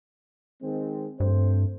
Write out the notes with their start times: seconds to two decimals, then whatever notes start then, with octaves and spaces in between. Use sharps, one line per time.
0.62 D#3 G#3 C4
1.20 G2 A3 C4 C5